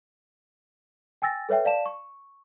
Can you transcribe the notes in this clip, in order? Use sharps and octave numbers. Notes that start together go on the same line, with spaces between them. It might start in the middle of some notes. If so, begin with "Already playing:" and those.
G5 G#5 E6 A6 A#6
A4 B4 C#5 E5 G5
D5 F5 A5 E7
C#6